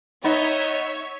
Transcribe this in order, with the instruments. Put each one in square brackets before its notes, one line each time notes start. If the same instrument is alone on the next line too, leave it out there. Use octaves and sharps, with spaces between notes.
[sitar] B3 D#4 [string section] C#5 E5